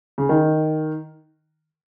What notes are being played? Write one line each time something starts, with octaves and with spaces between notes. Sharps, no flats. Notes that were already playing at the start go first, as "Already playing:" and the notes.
C#3
D#3